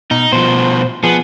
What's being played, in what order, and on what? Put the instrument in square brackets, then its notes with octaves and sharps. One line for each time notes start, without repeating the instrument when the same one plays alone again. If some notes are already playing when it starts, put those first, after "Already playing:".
[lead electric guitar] B2 [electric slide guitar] D#4
[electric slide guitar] B2 F3 [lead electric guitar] C5
[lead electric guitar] F3 G#4 [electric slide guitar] B3